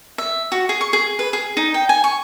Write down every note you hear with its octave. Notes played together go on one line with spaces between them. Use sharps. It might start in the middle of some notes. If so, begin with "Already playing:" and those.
E5
F#4
G#4
C#6
G#4
B4
G#4
D#4
G5
G#5
C#6